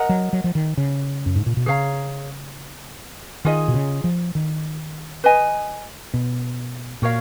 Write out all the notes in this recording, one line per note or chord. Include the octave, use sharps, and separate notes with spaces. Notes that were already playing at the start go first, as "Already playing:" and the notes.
Already playing: A#4 D#5 F#5 A#5
F#3
F#3
F3
D#3
C#3
F#2
G#2
A#2
B2
C#3 G#4 C#5 F5 A#5
D#3 F4 G#4 D#5
B2
C#3
F3
D#3
B4 D#5 G#5
B2
A#2 F#4 A#4 C#5 F5